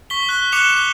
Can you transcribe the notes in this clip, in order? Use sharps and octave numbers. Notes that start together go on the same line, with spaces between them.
C#6 B6 G7
F#6 G7
D6 F#6 C#7 E7 F7 G7